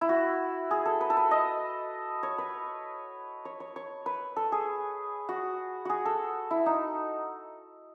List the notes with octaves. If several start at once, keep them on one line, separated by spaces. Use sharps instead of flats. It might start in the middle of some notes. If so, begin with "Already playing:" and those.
E4
F#4
G#4
A4
B4
A4
B4
D#5
C#5
B4
C#5
C#5
C#5
B4
A4
G#4
F#4
F#4 G#4
A4
E4
D#4